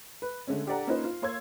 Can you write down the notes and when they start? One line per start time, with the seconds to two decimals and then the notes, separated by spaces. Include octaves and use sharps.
0.22 B4
0.47 D3 G#3 A3 C#4
0.66 D4 G4 A4 D5 F#5 A#5
0.87 A#3 C#4 D#4 F4 B4 C5
1.04 F4
1.22 A#3 C#5 F5 C6 E6 G#6